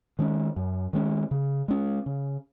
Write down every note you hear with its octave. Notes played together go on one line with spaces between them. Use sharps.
D#3 G#3 C#4
F#2
D#3 G#3 C#4
C#3
G#3 C#4
C#3